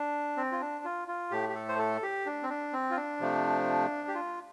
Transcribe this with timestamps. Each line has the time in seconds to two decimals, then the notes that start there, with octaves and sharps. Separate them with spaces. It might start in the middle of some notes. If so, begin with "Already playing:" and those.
Already playing: D4
0.37 C4
0.52 F4
0.61 D4
0.85 F4
1.08 F4
1.31 A2 A3 G4
1.49 G4
1.55 A4
1.69 C5
1.79 A4
2.03 G4
2.26 D4
2.43 C4
2.49 D4
2.73 C4
2.91 F4
2.97 D4
3.20 C3 F3 A3
4.08 G4
4.15 F4